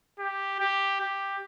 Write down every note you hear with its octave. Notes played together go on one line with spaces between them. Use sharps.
G4
G4
G4